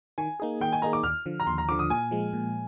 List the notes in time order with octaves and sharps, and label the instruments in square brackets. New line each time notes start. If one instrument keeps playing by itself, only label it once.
[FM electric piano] D#3 [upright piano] G#5
[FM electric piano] A#3 D#4 G#4
[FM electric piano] D#3 [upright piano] G5
[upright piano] G#5
[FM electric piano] A#3 D#4 G#4 [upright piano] A#5
[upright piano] D6
[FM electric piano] D#2 [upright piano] F6
[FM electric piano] D3 F3
[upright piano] A#5
[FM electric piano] D#2 [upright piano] C6
[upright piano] A#5
[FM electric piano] D3 F3 [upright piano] D6
[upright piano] D#6
[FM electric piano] A#2 [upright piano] G#5
[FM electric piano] F3 G#3
A#2